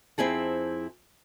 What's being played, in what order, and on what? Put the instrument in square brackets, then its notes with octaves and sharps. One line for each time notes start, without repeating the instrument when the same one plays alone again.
[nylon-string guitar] F2 D3 C4 E4 G#4 A5